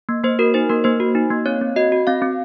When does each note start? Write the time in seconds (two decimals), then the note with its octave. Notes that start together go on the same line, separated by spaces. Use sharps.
0.09 A#3
0.23 A#3 C5
0.39 F#4 A#4
0.54 D#4 C5
0.69 A#3 A#4
0.84 A#3 C5
1.00 F#4
1.15 D#4
1.31 A#3
1.46 C4 C#5
1.61 C4
1.76 F#4 D#5
1.92 F#4
2.07 C4 F5
2.22 C4